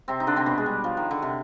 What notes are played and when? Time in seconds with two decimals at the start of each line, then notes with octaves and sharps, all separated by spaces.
0.08 C3 C4
0.20 D#4
0.27 D3 D4
0.36 C3 C4
0.46 B2 B3
0.58 G#3
0.66 G3
0.84 F3
0.97 D#3
1.11 D3
1.22 C3